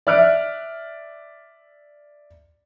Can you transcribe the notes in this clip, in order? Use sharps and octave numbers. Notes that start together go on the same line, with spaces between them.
D5 E5 F6 F#6 D7